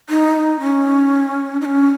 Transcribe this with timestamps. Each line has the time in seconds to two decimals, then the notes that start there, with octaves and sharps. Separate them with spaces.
0.10 D#4
0.60 C#4
1.61 D#4
1.65 C#4